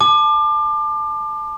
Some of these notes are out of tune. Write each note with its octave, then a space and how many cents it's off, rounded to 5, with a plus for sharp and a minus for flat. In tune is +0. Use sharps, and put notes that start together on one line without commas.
A5 -10 D6 +30